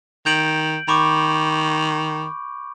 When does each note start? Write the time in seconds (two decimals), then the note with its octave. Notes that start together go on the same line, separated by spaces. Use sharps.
0.26 D#3 G6 D7 F#7
0.88 D#3 B5 C#6 D6